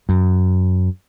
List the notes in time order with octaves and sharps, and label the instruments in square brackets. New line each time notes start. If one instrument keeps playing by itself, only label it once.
[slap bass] F#2